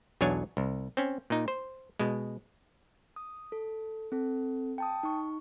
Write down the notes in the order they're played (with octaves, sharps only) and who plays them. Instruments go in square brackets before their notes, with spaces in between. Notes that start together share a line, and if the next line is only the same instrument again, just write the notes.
[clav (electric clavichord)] B1 E2 F#3 D4 C#5 G#5
C2
C4 C#4
A#2 D#4
C5
B2 G#3
[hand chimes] D#6
A4
C4 A4
G5 A5 D#6
D#4 C#6